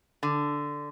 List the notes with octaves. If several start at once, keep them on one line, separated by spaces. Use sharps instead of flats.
D3